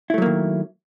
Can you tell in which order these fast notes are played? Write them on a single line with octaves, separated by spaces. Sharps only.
E4 A3 F#3 A#3 D#3